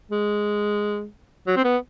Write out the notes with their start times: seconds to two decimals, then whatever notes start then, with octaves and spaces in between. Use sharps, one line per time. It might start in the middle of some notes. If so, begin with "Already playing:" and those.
0.11 G#3
1.47 F#3
1.57 C4
1.64 B3